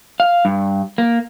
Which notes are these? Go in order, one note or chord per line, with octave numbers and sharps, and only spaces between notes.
F5
G2
A#3